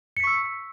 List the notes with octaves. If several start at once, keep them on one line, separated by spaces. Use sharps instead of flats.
C#6 E6 B6 C#7